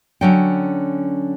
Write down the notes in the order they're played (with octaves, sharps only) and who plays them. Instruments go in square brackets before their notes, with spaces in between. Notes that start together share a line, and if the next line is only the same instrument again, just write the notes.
[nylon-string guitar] D3 F#3 C#4 G5